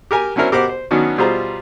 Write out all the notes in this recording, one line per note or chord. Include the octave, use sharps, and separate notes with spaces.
G4 A#4 G#5 A#5
F#3 C#4 D4 E4 A#4 C5
B2 G4 A#4 C5 F#5 D6
C5
D#3 F#3 B3 C#4 D4 F#4
B2 G3 F4 G#4 C5 A#5